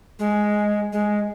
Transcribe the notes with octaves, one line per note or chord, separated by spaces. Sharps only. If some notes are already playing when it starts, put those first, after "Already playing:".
G#3
G#3